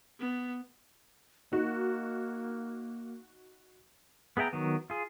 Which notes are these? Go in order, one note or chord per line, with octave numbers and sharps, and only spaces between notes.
B3
A#3 D#4 F#4
B3 G#4 E5 G5 A#5
D#3 F#3 B3
F4 G#4